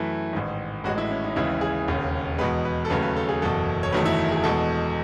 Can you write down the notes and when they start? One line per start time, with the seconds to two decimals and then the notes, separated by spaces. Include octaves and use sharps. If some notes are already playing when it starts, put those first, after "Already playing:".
Already playing: F#2 E3 A3 E4
0.33 A1 G#2 D#3
0.84 A1 A2 G#3 F#4
0.98 E4
1.10 C#4
1.24 D#4
1.36 D#2 C#3 E3 G#3 E4
1.61 G#4
1.88 E1 D#2 C#3
2.38 E2 B2 G#3 B4
2.65 B4
2.85 A4
2.90 D#2 C#3 F#3 A3 B4
3.03 B4
3.16 A4
3.29 G#4
3.42 F#1 E2 B2 A4
3.83 C#5
3.93 F#1 E2 D#3 F#3 A3 B4
4.05 E4
4.32 G#4
4.44 E2 B2 G#3 A4